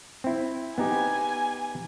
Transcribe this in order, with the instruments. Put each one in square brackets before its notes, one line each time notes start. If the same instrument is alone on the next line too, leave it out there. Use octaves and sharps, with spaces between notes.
[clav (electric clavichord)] C4 E4
[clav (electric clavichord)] B3 D#4 G4 [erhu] G#5